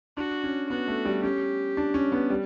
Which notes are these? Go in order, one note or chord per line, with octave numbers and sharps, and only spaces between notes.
D4 F#4
C#4
B3 F#4
A3
G3
C#4 G4
D4
C#4
B3
G3